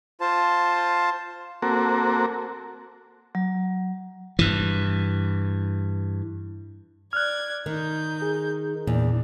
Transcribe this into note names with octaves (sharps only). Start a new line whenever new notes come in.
F4 C5 A5
A#3 C4 F#4 A4 A#4
F#3
G2 E3
D5 F6 F#6 G#6
D#3 D#4 G6
G#4
E2 A#2 D4